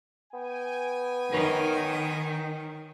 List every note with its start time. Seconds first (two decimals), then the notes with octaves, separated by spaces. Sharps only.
0.33 B3 G5 G#5
1.33 D#3 A#4 C#5